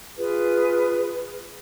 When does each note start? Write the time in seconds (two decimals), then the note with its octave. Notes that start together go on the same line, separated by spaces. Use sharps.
0.16 F4 G#4 B4